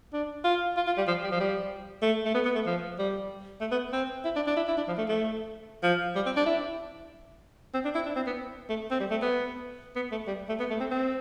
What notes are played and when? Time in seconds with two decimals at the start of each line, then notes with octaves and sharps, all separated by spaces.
0.13 D4
0.45 F4
0.77 F4
0.87 F4
0.97 G3
1.08 F3
1.24 G3
1.32 F3
1.40 G3
2.02 A3
2.26 A3
2.34 B3
2.45 B3
2.55 A3
2.66 F3
2.99 G3
3.61 A3
3.71 B3
3.93 C4
4.24 E4
4.36 D4
4.47 D4
4.57 E4
4.68 E4
4.77 D4
4.88 F3
4.98 A3
5.09 A3
5.83 F3
6.16 G3
6.26 C4
6.37 D4
6.46 E4
7.74 C4
7.85 D4
7.95 E4
8.06 D4
8.16 C4
8.26 B3
8.70 A3
8.91 C4
9.00 G3
9.11 A3
9.22 B3
9.96 B3
10.12 A3
10.27 G3
10.49 A3
10.60 B3
10.70 A3
10.80 C4
10.91 C4